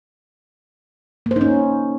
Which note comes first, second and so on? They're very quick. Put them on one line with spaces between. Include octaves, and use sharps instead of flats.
A#3 C5 D#4 C#4